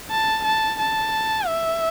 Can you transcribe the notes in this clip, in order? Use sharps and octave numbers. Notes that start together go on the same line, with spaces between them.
A5
A5
A5
E5